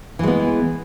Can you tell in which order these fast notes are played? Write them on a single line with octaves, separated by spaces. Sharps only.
E3 G#3 B3